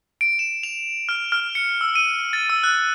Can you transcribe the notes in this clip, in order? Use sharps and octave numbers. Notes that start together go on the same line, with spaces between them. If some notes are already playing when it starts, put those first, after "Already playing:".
D7
E7
F7
F6
F6
C#7
E6
D#7
A6
E6
F#6